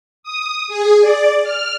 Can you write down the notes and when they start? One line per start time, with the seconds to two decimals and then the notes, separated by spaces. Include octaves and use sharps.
0.23 D#6
0.68 G#4
1.01 D5
1.43 F6